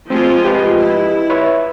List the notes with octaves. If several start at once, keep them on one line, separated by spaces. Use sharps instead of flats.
F3 G#3 C4 F4
G4 B4 D#5
E4
B4 C#5 E5